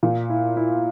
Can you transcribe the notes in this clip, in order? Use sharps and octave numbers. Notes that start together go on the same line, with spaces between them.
A#2
E4
E4